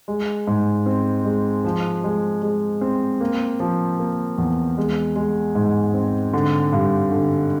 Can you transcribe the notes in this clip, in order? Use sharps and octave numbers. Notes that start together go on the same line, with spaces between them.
G#3
G#2
C4
G#3
F3
G#3
G#3
C4
A#3
F3
A#3
E2
G#3
G#3
G#2
C4
D3
G2
D3